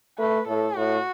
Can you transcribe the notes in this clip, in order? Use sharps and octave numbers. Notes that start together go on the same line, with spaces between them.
A3 B4
A2 A4
A2 F#4